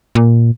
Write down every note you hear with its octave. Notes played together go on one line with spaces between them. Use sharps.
A#2